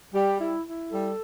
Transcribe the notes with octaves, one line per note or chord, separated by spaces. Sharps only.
G3 G4
E4
E4
G3 A4